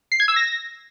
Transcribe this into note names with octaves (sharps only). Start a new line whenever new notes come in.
C7
G#6
E6
A#6